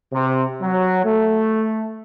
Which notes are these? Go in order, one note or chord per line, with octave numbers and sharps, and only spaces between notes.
C3
F#3
A3